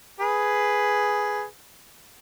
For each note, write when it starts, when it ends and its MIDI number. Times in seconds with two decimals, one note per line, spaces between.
0.20 1.43 68
0.20 1.43 71